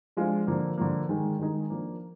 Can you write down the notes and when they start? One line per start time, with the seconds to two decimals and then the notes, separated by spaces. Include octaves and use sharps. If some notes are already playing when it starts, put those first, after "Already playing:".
0.17 F3 G#3 D4 F4
0.47 D3 F3 A#3
0.78 D3 F3 A#3
1.09 D#3 G#3 D#4 G#4
1.39 D#3 G#3 D#4 G#4
1.70 F3 A#3 D4